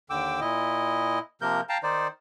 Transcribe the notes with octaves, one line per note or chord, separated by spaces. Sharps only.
D#2 D3 G5 D6 E6
A#2 E4 D#5
C3 F3 A#3 A#4 G6
F5 G5 A5 A#5
D#3 D#4 C5 D5